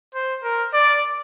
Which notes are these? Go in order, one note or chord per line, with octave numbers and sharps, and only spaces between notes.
C5
A#4
D5